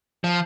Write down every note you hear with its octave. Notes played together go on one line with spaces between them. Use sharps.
F3